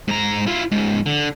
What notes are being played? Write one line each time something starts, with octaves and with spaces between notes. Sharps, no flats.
G#2 A#5
E4 F4
C#2 G#2
D3